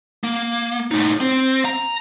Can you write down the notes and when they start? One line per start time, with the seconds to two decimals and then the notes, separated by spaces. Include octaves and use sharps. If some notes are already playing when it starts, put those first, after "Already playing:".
0.24 A#3
0.91 A2 D#4
1.20 C4
1.65 A#5